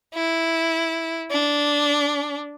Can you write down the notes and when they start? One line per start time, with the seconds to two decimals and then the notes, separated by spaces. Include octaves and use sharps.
0.14 E4
1.31 D4